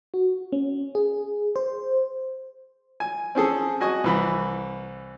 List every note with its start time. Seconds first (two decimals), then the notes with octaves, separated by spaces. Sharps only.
0.14 F#4
0.52 C#4
0.95 G#4
1.56 C5
3.00 G#5
3.35 C4 C#4 G#4 A4
3.81 F#4 D#5 G#5 C#6
4.04 C2 E3 B5